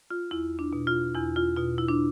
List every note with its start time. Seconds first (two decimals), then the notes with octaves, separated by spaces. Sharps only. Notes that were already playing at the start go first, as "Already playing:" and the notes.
0.11 F4
0.31 E2 E4
0.59 D4
0.73 B2
0.87 F4
1.15 E2 E4
1.36 F4
1.56 B2 F4
1.78 E4
1.89 D4